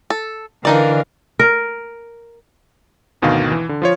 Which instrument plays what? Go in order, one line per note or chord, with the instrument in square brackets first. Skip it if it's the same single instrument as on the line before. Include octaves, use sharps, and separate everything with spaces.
[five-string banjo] A4
[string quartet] D3 E3 [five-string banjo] D4 D#4 D5 [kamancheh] A#4 F5
[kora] A#4
[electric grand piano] G#1 D2 B2 D#3 F5
E3
D3
F3 F4 C#5